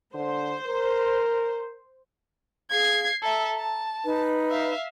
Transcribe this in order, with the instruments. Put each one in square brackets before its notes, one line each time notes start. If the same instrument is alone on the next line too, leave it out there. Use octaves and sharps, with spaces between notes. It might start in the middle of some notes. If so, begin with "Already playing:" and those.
[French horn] D3 [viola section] C5
[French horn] A#4
[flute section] G#4 F5 [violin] G#6 C7
[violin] A4 E5 [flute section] A#5
[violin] A5
[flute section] D#4 B4
[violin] E5 F5